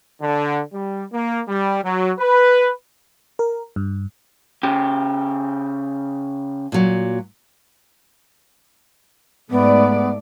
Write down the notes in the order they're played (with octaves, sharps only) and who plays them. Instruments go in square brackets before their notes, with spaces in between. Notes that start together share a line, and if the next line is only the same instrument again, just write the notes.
[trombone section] D3
G3
A#3
G3
F#3
B4
[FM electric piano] A#4
G2
[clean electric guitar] C#3 G4
[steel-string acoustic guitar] A#2 F#3
[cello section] G#2 A3 D5 [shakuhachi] B3